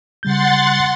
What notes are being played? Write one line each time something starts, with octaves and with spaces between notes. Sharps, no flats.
C#3 G3 F#5 C6 G6 A6